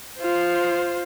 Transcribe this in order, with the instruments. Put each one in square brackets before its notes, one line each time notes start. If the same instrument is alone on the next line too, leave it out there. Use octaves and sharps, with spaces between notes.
[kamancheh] F4 C5